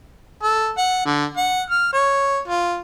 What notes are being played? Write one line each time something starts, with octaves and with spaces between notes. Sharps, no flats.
A4
F#5
D3
F#5
F6
C#5
F4